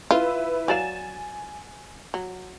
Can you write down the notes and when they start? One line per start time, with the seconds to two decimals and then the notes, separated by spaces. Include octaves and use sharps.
0.11 E4 F4 B4
0.68 F#3 D5 F5 G#5 A6 E7
2.14 F#3